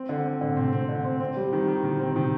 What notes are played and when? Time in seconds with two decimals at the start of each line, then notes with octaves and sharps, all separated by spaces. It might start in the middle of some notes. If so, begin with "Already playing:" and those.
Already playing: C4
0.09 D3
0.25 C4
0.41 A2 D3
0.49 A#2
0.56 A2 C3 C4
0.73 C4
0.89 D3
1.05 C4
1.20 C4
1.36 G3
1.53 D#3
1.68 D#3
1.83 A#2 D3 D#3
1.99 C4
2.15 A2 C3 D#3